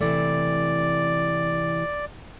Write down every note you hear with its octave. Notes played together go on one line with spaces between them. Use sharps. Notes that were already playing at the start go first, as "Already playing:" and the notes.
C3 E3 A3 D5